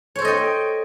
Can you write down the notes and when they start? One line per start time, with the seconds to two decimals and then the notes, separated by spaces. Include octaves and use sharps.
0.16 C#5
0.19 C5
0.22 A4
0.25 D#5
0.28 G5